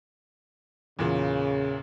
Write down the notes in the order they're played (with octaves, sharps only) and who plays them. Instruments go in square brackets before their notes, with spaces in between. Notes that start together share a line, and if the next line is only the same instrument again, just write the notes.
[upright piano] E2 A#2 [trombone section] C#3